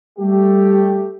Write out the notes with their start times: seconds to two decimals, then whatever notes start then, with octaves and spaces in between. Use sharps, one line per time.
0.19 G3 A3 G4